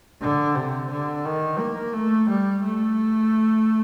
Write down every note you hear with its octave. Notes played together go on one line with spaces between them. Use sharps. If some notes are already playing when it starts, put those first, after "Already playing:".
D3
C3
D3
D#3
A#3
A3
G3
A3